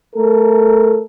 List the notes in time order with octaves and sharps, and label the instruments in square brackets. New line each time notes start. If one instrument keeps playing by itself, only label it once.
[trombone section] A3 A4 A#4